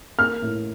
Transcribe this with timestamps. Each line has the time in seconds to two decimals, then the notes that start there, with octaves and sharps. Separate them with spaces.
0.19 A#3 F6
0.42 A2